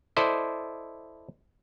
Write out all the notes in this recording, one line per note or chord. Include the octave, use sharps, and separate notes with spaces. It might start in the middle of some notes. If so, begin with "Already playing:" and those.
E4 A4 C5 D5 D#5